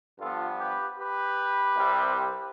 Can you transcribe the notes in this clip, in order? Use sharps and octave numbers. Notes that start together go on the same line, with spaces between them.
G2 F3 B3 F4 A4
G4 B4
G4 B4
C2 C3 G3 C4